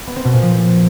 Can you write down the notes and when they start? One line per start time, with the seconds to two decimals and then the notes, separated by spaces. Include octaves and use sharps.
0.07 B3
0.16 C4
0.25 B2
0.33 A#2
0.42 F3